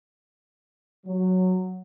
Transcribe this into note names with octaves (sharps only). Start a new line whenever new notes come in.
F#3